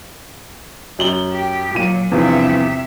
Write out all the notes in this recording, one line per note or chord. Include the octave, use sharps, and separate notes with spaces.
F#2 F#7 G7
G4
A#2 F#3 D#7
E2 G2 C3 F3 E5